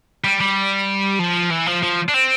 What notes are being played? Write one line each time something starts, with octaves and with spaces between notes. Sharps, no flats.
G3
G3
F3
E3
F3
F3
D4
C4